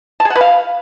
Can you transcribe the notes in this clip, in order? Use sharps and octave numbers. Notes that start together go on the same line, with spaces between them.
A5
G#4
F#5
B4
F5